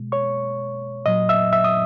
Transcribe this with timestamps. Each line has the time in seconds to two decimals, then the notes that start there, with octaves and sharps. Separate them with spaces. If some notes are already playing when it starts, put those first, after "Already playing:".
Already playing: B2 G#3
0.12 C#5 C#6
1.06 A#2 F#3 D#5 D#6
1.29 E5 E6
1.53 E5 E6
1.64 D#6